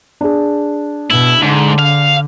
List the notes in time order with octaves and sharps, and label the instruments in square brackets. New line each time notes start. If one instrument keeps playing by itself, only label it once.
[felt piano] D4 G#4
[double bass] B2 [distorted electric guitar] E4
[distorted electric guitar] G#2 [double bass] D3
[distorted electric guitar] F5